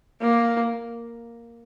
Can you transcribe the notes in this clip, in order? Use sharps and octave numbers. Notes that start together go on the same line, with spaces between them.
A#3